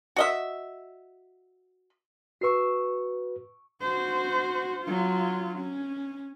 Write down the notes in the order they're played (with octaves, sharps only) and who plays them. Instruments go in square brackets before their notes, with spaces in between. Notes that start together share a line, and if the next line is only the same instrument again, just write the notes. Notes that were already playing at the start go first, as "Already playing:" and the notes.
[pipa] F#4 D#5 E5
[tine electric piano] F#4 B4 [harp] C#6 E6 C7
[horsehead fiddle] F#4 C5
F#3 F4
C#4